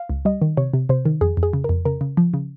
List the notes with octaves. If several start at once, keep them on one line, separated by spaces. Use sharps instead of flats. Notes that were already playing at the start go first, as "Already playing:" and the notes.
Already playing: F5
C#2
G3 D#5
D#3
C3 C#5
C3
C3 C5
D#3
F2 G#4
F2
G#4
C#3
A#4
F2
C#3 A#4
C#3
F3
C#3